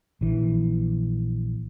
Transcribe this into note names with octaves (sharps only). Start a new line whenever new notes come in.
A#1 E3